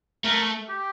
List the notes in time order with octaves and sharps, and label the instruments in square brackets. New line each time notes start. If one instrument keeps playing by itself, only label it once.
[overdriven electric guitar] A3 [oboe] A#4
[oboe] G4